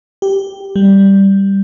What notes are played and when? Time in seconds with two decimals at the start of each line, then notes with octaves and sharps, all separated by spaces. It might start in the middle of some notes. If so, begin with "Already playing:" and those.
0.22 G4
0.76 G3